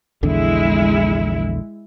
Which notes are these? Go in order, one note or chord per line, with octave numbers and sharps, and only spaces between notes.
A#1 E2 D3 G#3 E4